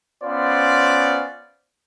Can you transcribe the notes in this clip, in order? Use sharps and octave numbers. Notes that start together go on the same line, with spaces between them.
B3 C#4 F4 C5 D5